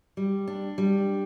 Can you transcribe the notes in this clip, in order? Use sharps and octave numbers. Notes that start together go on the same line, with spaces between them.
G3
D4
G3